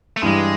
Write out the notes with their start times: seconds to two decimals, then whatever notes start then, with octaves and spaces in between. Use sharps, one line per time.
0.17 A3
0.22 G2 E3 G3 G#3